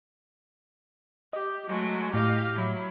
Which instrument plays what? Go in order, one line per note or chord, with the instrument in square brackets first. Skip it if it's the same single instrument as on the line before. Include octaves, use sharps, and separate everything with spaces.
[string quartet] G4 [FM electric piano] D#5
[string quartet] F#3 G#3 A3
[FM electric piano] A2 [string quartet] G4 D#5 F5
[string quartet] F#3 E4